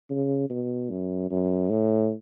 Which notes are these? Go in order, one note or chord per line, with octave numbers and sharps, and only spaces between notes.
C#3
B2
F#2
F#2
A2